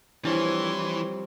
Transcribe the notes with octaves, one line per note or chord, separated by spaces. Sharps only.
E3 F3 G3 C4 D4 E4 C#5 C6